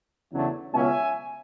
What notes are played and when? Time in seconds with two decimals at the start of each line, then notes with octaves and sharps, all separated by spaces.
0.32 E2 C#3 F#3 A3 D4
0.73 C#2 B2 F#3 C#4 E5 G#5